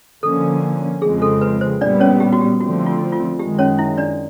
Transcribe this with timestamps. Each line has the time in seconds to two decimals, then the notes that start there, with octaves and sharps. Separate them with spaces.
0.23 D3 F3 A#3 C#4 A4
1.02 F2 C#3 F3 G#3 C4 G#4
1.22 A4
1.41 B4
1.61 C5
1.81 A#2 G3 B3 D4 D5
2.00 C#4 C#5
2.20 G4
2.32 F#4
2.41 G4
2.60 D3 F3 A3 C4 F#4
2.86 F4
3.12 F4
3.39 F#2 D#3 G#3 G4
3.59 C#4 C#5
3.79 E4 E5
3.98 D4 D5